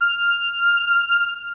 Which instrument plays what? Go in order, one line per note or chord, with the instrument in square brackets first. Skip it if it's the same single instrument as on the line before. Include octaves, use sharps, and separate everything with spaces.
[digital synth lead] F6